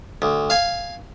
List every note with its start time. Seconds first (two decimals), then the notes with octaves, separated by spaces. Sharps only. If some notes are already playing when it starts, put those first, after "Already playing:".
0.22 D2
0.50 F5 G#5